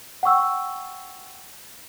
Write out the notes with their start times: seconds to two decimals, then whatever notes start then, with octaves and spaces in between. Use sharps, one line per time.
0.23 F#5 G5 C#6 E6